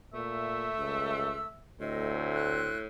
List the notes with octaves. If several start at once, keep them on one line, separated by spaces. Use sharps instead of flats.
A#2 A3 E5
C#2 E6
D2 A2 C4 D#5
F#6